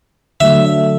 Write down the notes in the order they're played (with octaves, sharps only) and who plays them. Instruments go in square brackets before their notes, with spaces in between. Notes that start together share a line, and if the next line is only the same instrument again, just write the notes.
[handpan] D3 F#3 A3 [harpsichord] E5